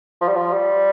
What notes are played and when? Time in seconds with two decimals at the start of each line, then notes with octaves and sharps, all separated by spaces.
0.21 F3
0.28 G3
0.36 F3
0.53 G3